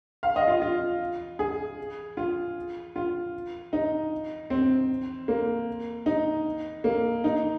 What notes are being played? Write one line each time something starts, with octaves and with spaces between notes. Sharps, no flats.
F5
D#5
F4
F4
G#4
F4
F4
D#4
C4
A#3
D#4
A#3
D#4